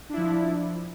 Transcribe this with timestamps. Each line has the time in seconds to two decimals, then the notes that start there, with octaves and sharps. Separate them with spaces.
0.09 D4
0.13 E4
0.17 F3